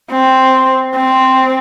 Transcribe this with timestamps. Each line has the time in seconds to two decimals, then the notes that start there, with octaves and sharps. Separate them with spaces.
0.11 C4
0.95 C4